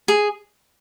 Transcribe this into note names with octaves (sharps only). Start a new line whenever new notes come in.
G#4